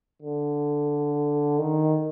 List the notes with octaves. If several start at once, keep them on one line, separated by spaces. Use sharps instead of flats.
D3
D#3